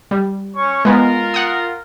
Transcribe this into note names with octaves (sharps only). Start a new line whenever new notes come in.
G3
C#4 C#6
G#3 B3 F4 A#4
F#5 D#6